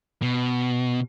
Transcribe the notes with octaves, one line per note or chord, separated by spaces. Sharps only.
B2